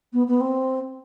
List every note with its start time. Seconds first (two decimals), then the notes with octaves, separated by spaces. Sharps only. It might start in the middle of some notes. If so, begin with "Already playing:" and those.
0.13 B3
0.27 B3
0.40 C4